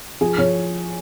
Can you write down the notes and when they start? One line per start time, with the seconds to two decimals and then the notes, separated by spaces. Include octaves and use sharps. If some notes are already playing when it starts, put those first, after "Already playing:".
0.21 F3 G#4
0.38 F3 C#5